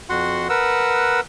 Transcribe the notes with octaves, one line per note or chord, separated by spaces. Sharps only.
F2 F#4 F#5 C6
A#4 B4 F#5 E6